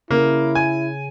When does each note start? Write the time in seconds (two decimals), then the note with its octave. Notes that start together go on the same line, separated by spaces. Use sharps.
0.11 C#3 A#3 E4
0.55 G#5